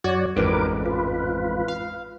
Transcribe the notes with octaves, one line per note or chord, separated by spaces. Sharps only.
F#2 F#4 C#5 D5
A1 F2 G#2 A#4 B4 D6
F4 B4
F5